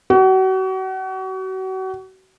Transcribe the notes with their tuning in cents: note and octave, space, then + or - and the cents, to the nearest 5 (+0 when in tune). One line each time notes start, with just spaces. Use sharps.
F#4 +35